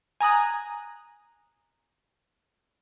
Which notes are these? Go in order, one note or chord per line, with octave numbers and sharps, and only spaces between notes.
G#5 A#5 D#6 F#6